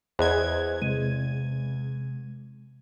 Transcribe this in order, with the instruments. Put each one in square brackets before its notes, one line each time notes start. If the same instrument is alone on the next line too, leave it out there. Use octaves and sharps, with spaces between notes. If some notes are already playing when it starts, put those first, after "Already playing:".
[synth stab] E2 G#6 [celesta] G#4 F#6 [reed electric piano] C5 D#5
[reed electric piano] C3 G#3 [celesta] D#7